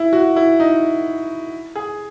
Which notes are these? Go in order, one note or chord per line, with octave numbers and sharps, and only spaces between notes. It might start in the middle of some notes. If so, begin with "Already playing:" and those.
Already playing: E4
F#4
E4
D#4
G#4